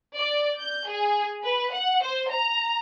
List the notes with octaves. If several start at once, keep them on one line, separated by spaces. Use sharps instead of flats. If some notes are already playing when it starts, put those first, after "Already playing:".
D5
G6
G#4
B4
F#5
C5
A#5